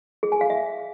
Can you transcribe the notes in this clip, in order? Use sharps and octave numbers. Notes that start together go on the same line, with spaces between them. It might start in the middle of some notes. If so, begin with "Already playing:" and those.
G#4
G#5
F5
E5